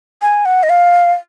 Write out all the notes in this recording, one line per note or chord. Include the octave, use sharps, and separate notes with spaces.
G#5
F#5
D#5
F5